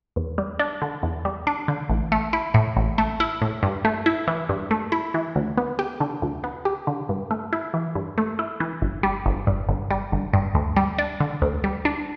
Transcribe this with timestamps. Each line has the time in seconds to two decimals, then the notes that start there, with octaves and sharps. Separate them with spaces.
0.16 E2
0.38 G3
0.59 D4
0.82 D3
1.03 E2
1.25 G3
1.47 D4
1.68 D3
1.90 A1
2.12 A3
2.33 E4
2.54 A2
2.77 A1
2.98 A3
3.20 E4
3.42 A2
3.63 G2
3.85 A3
4.06 E4
4.28 E3
4.49 G2
4.71 A3
4.92 E4
5.14 E3
5.36 D2
5.57 B3
5.79 G4
6.00 D3
6.22 D2
6.44 B3
6.65 G4
6.87 D3
7.09 G2
7.31 A3
7.53 E4
7.74 E3
7.95 G2
8.18 A3
8.39 E4
8.60 E3
8.82 G1
9.03 G3
9.26 G1
9.47 G2
9.69 G1
9.91 G3
10.12 G1
10.33 G2
10.55 D2
10.77 G3
10.98 D4
11.20 D3
11.42 D2
11.64 G3
11.85 D4